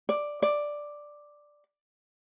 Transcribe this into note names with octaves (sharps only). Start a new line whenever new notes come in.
D5
D5